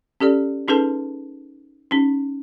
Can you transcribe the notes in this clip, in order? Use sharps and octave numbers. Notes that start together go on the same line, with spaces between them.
C#4 G4 A4 D5
C#4 D#4 G#4 A4 B4 A5
C#4 D#4